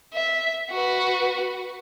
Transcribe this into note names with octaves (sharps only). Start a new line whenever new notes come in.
E5
F#4 B4